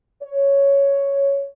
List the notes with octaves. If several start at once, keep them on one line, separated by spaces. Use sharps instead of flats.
C#5